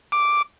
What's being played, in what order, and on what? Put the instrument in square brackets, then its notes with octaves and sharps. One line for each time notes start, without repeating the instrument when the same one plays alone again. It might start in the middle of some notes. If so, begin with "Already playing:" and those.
[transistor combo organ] D6